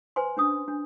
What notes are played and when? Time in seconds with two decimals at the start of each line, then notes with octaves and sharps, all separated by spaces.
0.16 B4 C5 G#5 C6
0.37 C#4 D4 D#6
0.68 D4